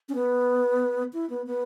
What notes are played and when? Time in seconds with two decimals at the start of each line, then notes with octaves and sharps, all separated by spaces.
0.09 C#4
0.15 B3
1.13 E4
1.30 B3
1.46 B3